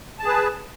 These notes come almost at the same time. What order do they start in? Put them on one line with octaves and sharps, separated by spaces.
A5 G#4 B4